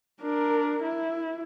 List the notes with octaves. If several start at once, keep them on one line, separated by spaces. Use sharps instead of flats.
D4 A#4
E4